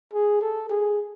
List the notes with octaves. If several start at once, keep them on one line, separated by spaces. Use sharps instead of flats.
G#4
A4
G#4